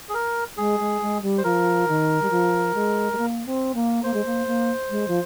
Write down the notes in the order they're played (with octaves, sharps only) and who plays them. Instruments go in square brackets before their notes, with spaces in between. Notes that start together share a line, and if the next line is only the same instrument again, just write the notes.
[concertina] G#4
A#4
[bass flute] G#3 [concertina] G#4
[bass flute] G#3
G#3
G3
[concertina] C5
[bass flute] F3 [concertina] A#4
[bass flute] D#3
G3
F3
G#3
G#3
A#3
C4
A#3
[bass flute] A#3 [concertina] C5
[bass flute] G#3
A#3
A#3
G#3
F3